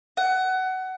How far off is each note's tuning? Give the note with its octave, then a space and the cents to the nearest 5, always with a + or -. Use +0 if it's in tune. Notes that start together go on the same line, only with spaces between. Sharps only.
F#5 +20